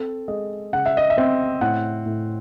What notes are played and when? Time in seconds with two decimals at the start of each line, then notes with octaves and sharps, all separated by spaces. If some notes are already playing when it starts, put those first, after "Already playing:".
Already playing: C4 A4
0.28 G#3 D#5
0.73 C#3 F#5
0.86 E5
0.97 D#5
1.10 E5
1.18 C4
1.61 A2 F#5
2.06 A2